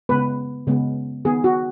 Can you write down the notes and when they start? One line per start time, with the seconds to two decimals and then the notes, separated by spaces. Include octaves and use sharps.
0.09 C#3 G#3 B3 B4
0.67 C#3 G#3 B3
1.25 D#3 B3 G#4
1.44 F#4